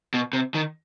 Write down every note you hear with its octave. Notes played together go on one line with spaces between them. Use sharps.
B2
C3
D#3